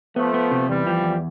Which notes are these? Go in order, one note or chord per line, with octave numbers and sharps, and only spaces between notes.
F3 A3 B3
B3
C3
E2 E3 G3
F3
E2